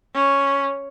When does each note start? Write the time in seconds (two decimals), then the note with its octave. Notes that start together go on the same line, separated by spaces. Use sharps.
0.15 C#4